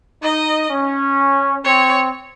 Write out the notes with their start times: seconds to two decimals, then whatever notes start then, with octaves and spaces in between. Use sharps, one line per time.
0.23 D#4 D#5
0.70 C#4
1.64 C4 C#5